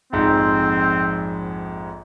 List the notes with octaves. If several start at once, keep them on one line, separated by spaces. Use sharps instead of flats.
A#1 F2 G#2 C4